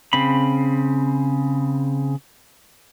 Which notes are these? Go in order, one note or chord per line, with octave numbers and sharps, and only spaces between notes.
C#3 C4 B5